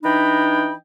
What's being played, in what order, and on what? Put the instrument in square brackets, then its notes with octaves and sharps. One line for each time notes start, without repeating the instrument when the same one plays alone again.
[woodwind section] E3 D4 D#4 D#5 G5 B5